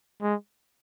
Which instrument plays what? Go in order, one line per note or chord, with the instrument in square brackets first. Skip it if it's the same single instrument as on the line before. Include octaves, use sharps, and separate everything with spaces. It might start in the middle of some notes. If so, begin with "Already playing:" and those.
[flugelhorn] G#3